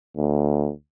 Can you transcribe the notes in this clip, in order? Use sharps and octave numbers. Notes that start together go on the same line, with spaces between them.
D2